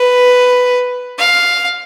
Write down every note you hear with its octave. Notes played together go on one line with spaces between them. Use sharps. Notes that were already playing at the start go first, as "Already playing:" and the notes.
Already playing: B4
F5